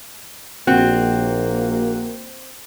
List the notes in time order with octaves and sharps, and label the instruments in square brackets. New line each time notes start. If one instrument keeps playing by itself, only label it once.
[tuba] A#1 [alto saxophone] A#3 [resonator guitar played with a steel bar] C4 [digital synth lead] F#4